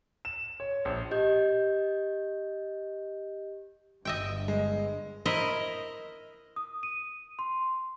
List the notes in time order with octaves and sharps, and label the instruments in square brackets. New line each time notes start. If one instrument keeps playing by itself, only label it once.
[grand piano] E7
C#5
A#1
[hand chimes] G4 D#5 G6
[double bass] G1 G2 [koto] D#5 E5 G5
[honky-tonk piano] G#3
[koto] E4 A#4 C5 D#5
[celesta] D#6
D#7
C6